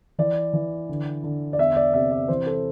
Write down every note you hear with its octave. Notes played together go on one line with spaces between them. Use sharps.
E3 D5
E3
D3
D3
D5
E2 E5
D5
C3 E5
D5
E3 C5
A4